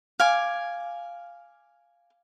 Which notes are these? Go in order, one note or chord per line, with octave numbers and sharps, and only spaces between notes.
F5 G#5 D6